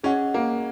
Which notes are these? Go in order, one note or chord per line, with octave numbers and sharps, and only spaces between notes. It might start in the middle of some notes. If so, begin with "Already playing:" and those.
C#4 G#4 D#5 F#5
A#3